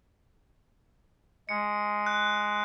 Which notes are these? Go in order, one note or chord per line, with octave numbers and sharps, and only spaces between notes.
G#3 C#7
F#6